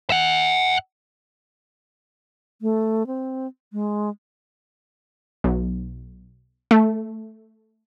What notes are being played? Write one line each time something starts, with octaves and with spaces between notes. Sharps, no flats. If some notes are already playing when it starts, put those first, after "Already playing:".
E5 F#5
A3
C4
G#3
B1
A3